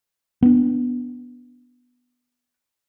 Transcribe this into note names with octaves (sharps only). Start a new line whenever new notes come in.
B3 D4